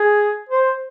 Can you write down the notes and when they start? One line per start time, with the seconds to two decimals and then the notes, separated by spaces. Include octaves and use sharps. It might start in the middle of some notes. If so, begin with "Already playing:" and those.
Already playing: G#4
0.49 C5